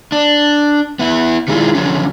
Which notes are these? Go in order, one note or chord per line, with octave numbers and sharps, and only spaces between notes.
D4
B3 E4
D#3 G3 G#3 A#3 E4 F4
D3 F3 F#3 C#4